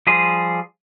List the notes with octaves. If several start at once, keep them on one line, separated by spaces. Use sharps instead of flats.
F3 G3 G#4 C5